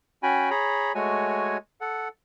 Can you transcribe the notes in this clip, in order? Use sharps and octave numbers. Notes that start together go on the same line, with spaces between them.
C#4 F#4 G5 G#5 B5
G#4 C#5 A#5 B5
G#3 A3 F#4 C#5 G#5
A4 F#5